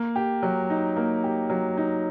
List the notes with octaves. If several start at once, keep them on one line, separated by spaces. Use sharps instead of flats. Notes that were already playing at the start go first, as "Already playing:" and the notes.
Already playing: A#3
G4
F#3
D#4
A#3
G4
F#3
D#4